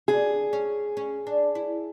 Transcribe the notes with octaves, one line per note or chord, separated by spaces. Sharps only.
D4 G#4
C#4
C#4
D4
E4